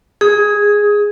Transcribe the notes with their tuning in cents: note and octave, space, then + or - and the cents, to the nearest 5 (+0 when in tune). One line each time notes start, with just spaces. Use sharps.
G#4 -5 D#6 +20